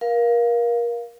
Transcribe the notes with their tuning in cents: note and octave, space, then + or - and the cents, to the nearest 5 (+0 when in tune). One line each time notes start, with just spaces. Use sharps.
A#4 +30 F5 +0